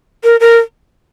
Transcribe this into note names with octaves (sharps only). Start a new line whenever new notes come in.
A#4
A#4